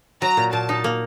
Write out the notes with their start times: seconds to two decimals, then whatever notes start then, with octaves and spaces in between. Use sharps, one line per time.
0.22 F#3 A#5
0.37 A#2
0.53 A#2 A5
0.69 D#4
0.84 A#3